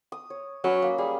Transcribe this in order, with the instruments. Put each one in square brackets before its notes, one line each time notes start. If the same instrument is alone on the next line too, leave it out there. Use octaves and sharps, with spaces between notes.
[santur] D#6
C#5
[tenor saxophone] F#3 [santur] C#4 B4
[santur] A#3
[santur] G3 [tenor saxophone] G#4